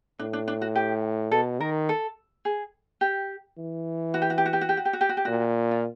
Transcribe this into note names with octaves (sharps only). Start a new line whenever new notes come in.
A2 D4
D4
D4
F#4
G4
B2 A4
D#3 A#4
A4
G#4
G4
E3
F#4
G4
F#4
G4
F#4
G4
F#4
G4
F#4
G4
F#4
G4
F#4
G4
A#2 F#4
F4